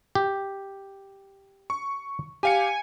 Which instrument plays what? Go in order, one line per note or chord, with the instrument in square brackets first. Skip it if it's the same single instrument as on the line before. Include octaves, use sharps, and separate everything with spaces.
[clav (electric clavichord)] G4
[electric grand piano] C#6
[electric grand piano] G4 F5 C#7 [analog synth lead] G#5